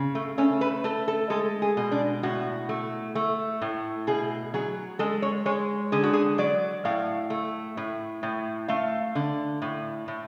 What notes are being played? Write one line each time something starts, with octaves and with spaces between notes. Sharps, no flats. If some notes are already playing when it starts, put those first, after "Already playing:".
Already playing: C#3
A3
A3 C#4
B4
A3 A4
A4
G#3 A4
G#4
B2
D4
A2 F#4
A3
A3
A2
B2 G#4
F#3 G#4
G#3 A4
C#5
G#3 C#5
D3 G#4
F#4
G#4
F#3 D5
A2 F5
A3
A2
A2
A3 F5
D3
A2
A2